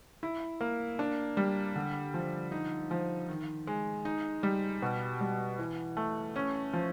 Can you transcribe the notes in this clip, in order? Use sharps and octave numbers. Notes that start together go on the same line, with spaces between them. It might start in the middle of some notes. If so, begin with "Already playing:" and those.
E4
A#3
D4
G3
D3
F3
D#4
F3
D#3
G#3
D#4
G3
B2
G3
E3
A3
C#4
F3